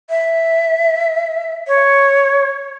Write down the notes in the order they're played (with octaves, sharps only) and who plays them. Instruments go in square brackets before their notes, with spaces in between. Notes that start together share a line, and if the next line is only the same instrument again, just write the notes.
[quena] E5
C#5